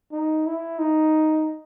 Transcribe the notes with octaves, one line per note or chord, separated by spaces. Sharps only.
D#4
E4
D#4